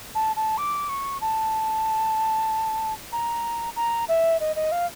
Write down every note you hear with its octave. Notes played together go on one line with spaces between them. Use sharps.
A5
A5
D6
C#6
A5
A#5
A#5
E5
D#5
D#5
F5